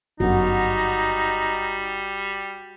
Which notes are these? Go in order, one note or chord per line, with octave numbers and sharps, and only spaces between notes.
G1 F#2 G3 D#4 F#4